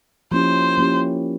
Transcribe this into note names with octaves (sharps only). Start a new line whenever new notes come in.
F3 A#3 C#4 E4 G4 C5
F3 A#3 C#4 E4 G4